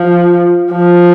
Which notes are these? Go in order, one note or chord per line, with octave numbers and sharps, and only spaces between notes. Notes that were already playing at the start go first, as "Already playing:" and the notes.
Already playing: F3
F3